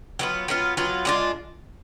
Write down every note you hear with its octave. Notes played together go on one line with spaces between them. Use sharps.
F#3 B3 F4
F#3 B3 F4
F#3 B3 F4
G#3 D4 F4